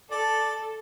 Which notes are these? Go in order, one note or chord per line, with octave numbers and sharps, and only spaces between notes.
A4 D5